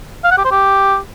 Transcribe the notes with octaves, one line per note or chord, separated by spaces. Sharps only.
F5
F#5
G4
C5
G4